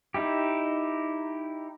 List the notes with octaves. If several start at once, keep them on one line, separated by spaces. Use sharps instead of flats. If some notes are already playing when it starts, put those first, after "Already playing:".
D#4 E4 G4